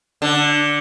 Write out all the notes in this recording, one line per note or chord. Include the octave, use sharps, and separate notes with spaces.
D3